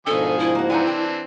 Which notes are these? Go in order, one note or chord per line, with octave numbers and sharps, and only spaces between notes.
G#2 B2 D#3 F3 D4 A4 G#5 D#6
E4
A#3 F#4
E3 C4 D4 D#4 F#5 G#5
G5 A5